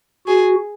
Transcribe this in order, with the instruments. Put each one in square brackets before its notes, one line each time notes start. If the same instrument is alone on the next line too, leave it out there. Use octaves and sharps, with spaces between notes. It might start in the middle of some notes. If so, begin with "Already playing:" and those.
[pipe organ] F#4 [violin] G#4